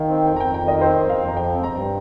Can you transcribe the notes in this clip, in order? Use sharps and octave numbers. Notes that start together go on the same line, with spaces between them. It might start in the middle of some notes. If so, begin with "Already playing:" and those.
Already playing: D#3 F5 G5
C4
F2 G5
A#5
F2 G5
G5
D#3
D#5
C4 C5
F2
F5
F2
A#5
F3 G5
C4
A#5
G2